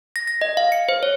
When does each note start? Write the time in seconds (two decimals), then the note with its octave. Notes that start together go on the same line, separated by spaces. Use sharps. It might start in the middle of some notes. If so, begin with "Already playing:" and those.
0.16 A#6
0.27 A#6
0.41 D#5
0.57 F5
0.72 C#7
0.89 C5
1.03 C#5